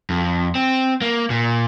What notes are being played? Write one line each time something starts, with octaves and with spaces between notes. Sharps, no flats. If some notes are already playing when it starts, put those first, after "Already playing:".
F2
C4
A#3
A#2